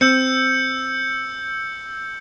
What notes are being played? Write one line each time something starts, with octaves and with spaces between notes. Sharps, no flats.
C4 E6 G6 C#7